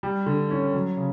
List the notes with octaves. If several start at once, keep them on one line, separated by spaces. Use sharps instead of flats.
G3
D3
C#4
F#3
C#3